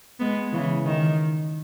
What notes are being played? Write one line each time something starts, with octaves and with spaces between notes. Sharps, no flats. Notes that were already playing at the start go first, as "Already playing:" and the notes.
G#3 B3
C#3 E3
D#3